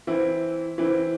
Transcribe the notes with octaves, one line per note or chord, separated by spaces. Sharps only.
E3 C4 E4
E3 C4 E4